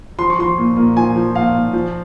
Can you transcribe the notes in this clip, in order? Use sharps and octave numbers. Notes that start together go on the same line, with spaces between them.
F3 C6
C#6
F3 C6
A#2
A#2
F3 G#5
F3
A#2 F5
A#2
F3